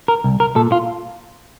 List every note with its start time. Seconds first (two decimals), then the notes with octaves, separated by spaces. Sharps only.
0.08 A#4
0.24 C2
0.40 A#4
0.56 A#2 A4
0.72 F4